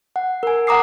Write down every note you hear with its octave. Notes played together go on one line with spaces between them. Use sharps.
F#5
A#4 G#5
F#5 G#5 A#5 D6 D#6 C7